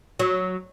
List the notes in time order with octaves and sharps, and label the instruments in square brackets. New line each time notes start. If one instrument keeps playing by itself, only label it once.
[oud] F#3